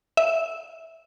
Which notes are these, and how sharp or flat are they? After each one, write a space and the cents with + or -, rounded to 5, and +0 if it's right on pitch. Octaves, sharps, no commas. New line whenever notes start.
E5 -10